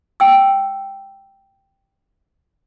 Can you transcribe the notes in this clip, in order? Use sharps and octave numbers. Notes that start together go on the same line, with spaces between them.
G5 E6